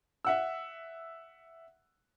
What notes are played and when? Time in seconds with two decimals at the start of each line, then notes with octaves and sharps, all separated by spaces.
0.25 E5 F#5 E6